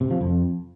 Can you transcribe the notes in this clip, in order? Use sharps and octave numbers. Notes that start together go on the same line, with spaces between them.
C3
F3
F2